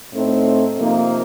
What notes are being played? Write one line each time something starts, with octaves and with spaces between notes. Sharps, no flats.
A2 A3 C4 D#4
C3 F3 A#3 D#4